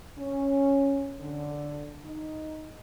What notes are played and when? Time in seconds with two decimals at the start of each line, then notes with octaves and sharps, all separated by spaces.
0.18 C#4
1.20 D3
2.05 D#4